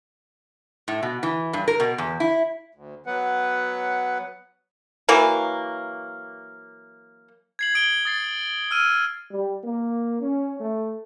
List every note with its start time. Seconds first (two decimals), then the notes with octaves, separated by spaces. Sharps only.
0.88 A2
1.03 B2
1.23 E3
1.53 G2
1.68 A#4
1.80 B2
1.98 E2
2.20 E4
2.75 D2
3.06 F#3 B3 B4 F#5
5.09 E3 F#3 A#3
7.59 G#6 C7 F#7
7.75 D#6 D7 F#7 G7
8.05 D#6 A6 C7
8.71 E6 F6 D#7
9.30 G3
9.63 A#3
10.21 C#4
10.60 A3